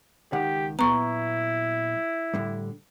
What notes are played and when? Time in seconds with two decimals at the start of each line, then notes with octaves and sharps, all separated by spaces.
0.33 C#2 D#3 G4 F#5
0.79 A#2 F#3 B3 E4 A#5 C#6
2.34 A2 D3 G3